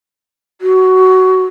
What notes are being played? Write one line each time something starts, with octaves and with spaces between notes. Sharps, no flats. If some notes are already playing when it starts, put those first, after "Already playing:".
F#4